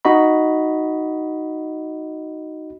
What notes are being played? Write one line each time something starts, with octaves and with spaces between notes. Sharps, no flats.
D#4 F#4 D#5 B5